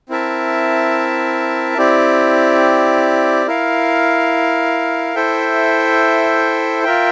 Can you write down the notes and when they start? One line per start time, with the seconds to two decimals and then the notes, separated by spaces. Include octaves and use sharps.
0.09 C4 E4 A#4 E5 A5
1.78 C4 E4 G4 D5
3.47 E4 A#4 F5
5.15 E4 A4 C5 E5 G5
6.84 F4 A#4 E5 G5